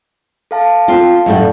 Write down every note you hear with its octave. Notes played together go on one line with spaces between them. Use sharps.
A4 F5 A5
C4 F4
F#2 A2 G3